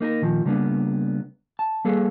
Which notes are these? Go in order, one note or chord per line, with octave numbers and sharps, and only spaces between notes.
A#3 D#4 A4 A#4
A#2 D#3 F3
C#3 G3 A#3 B3 C#4 D4
A5
G3 A#3 G#4 A4 B4